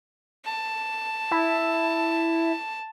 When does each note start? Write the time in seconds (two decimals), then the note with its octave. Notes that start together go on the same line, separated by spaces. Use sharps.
0.45 A5
1.31 E4